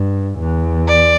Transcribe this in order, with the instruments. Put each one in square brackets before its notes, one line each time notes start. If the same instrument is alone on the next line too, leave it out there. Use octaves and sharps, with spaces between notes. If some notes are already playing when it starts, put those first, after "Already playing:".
Already playing: [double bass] G2
E2
[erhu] D5